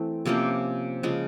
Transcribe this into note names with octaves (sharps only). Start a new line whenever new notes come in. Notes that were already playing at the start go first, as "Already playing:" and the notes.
Already playing: E3 A3 C4
C3 F3 A#3 C#4
C#3 F3 G#3